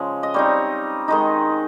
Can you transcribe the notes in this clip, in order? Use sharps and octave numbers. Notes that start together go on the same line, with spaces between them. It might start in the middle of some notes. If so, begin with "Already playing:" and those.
Already playing: C#3 F3 G#3
D#5
G3 C4 D#4 C#5
D#3 G#3 D#4 D#5